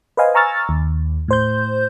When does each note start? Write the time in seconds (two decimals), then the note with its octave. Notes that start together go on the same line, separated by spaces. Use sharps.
0.17 B4 C5 D#5 F5 G#5
0.34 G#5 A#5 C#6 E6 F6 A6
0.69 D#2
1.28 A2 C5 G6